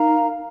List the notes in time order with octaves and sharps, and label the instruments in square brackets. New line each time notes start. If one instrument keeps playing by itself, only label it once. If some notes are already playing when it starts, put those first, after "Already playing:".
Already playing: [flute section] D#4 A#4 F5 A#5